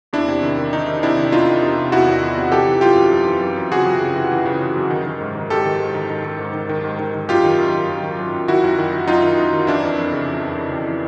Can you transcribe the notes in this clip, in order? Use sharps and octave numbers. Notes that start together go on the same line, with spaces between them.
E2 D4 E4
C3
D#3
D#3
D#3 D#4
D#3
C3 D4 E4
D#3
E2 D#4 F4
E2
C3
C3
E2 E4 F#4
E2
E2
C3
E3 G4 A4
E3
F#2 F4 G4
F#2
F#2
E3
F#2
F#2
C#3 F#4 G#4
F#2
C#3
E3
E3
C#3
C#3
F#2
D#3
D#3
G#2
D#3
G#2 G4 A4
D#3
G#2
D#3
D#3
D#3
G#2
D#3
D#3
G#2
D#3
D#3
F#2 F4 G4
D#3
F#2
D#3
F#2
D#3
F#2
F#2
D#3 E4 F#4
F#2
D#3
D#3
F#2 D#4 F4
D#3
F#2
D#3
E3 D4 E4
F2
F2
C#3
F2
F2
C#3
F2
E3